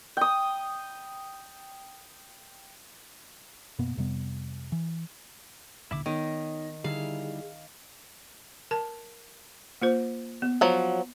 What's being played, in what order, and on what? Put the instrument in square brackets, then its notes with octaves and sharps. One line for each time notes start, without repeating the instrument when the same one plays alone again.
[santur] G5 D#6
[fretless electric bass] F#2 B2 A#3 B3
F2 C3 G3 B3
E3
[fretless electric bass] D#1 A#1 D3 [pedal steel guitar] E4 E5 D6
[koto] D#3 [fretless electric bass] B3 [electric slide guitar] D#4 C#5 [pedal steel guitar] D#5
[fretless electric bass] D3 [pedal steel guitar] G3 D#4 E4 [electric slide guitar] G#4 [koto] F5
[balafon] A#4 A5
A#3 F4 C5
B3
[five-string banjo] F3 F#3